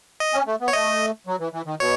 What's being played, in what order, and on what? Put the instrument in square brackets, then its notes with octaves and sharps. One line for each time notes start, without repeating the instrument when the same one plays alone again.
[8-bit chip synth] D#5
[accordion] C#4
A3
B3
[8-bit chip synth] C#5
[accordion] A3 [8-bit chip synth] D#5
[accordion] F#3
E3
E3
D#3
[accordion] B2 [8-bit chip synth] C#5